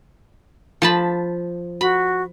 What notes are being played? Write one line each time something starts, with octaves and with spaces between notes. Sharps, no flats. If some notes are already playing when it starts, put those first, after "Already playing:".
F3 A5 B5
F#4 B5